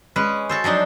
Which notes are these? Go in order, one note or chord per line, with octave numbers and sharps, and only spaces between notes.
G#3 C#4 B4
F#4 A4 C5
F3 F#3 D4 D#4